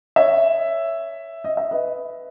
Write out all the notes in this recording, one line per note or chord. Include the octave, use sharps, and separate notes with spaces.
C#5 E5
D#5
E5
B4 D#5